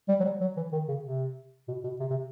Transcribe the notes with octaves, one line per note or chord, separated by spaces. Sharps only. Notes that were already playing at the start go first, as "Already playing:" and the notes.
G3
F#3
G3
F#3
E3
D#3
C#3
C3
B2
B2
C3
C3